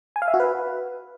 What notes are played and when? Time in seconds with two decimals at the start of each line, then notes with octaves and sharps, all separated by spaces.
0.16 G#5
0.22 F5
0.28 E5
0.34 F#4
0.40 B4